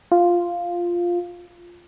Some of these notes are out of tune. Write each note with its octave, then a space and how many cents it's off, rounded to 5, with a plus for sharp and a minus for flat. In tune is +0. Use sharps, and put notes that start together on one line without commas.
F4 +0